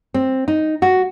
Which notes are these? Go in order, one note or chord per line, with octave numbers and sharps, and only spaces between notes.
C4
D#4
F#4